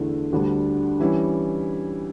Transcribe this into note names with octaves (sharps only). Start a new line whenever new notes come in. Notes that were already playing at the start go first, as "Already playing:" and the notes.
Already playing: E2 D3 A3 E4
D2 D3 G3
E3 G3 C#4 E4